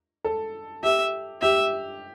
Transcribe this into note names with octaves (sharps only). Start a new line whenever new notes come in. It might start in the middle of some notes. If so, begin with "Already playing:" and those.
A4
G4 E5
G4 E5